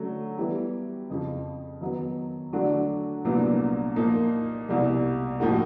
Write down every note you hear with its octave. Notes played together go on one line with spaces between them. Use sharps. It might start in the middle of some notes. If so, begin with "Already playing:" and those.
Already playing: D3 F#3 A3 C#4 F#4
E3 G3 B3 E4 G4
F2 C#3 F3
D#3 F#3 B3
D3 F#3 A3 D4 F#4
C2 A#2 F#3 B3 D4
A#2 F3 A#3 D#4
C2 B2 G3
A2 F3 A#3 D#4 F#4